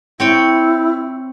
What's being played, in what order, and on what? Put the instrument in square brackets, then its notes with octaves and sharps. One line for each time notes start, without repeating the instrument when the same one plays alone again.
[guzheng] C4 C#5 G5 [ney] E4